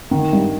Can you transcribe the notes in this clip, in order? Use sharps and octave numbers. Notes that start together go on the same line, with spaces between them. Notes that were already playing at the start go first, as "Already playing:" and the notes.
D#3
G2